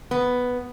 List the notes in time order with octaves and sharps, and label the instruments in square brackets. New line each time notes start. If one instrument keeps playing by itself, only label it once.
[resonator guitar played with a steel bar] B3